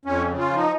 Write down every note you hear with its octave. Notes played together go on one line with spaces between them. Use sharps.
F2 C#4
C#3
F4
F3
D#4